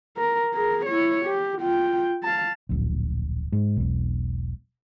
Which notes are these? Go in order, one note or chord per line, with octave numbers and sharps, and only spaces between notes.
A#4
G#4 A#4
E4 C#5
G4
F4 G5
F5 A5
D1 A#1
G#2
E1 B1